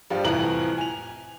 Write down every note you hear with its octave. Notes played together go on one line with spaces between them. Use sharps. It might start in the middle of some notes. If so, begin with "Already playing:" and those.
G2 F3 G3
C2 F2 A2 E3 A#5 F#7
G#5 F7